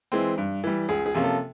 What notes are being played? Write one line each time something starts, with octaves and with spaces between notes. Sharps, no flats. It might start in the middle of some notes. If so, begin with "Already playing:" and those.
E3 G#3 C4
G2
E3 G3
C#2 G#4
G#4
C3 F3 A#3 C#4
A4